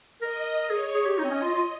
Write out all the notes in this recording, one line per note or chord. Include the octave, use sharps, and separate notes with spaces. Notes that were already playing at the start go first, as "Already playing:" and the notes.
A#4 D#5
G#4 C#5
G#4
G4
D#4 D#5
C4
C#4
F4
F4